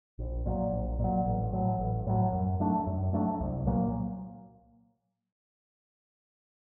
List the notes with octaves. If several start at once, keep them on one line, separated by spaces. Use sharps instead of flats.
A#1
A#2 F#3
A#1
A#2
F#3
A1
A2 F#3
A1
A2 F#3
F#2
F#3 A3 D4
F#2
F#3 A3 D4
C2
A#2 F#3 A#3